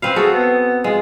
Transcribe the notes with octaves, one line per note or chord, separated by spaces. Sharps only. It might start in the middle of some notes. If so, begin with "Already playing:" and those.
C4 B4 F5
F#4 G#4 A4
B3
G#3 F4